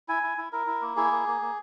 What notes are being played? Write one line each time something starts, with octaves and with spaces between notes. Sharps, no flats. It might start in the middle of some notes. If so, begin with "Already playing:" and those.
E4 G#5
E4
E4
E4 A#4
E4
A#3
E4 G#4
A#3
A#3
A#3